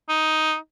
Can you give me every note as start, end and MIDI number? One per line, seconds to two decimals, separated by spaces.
0.09 0.56 63